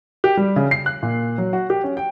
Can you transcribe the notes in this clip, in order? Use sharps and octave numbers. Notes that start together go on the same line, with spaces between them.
G4
G3
C#3
C7
F#6
A#2
F#3
F#4
G4
C#4
G5